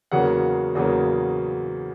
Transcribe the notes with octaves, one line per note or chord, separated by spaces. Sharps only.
E2 C#3 F#3 A#3 F#5
E2 C#3 F#3 A#3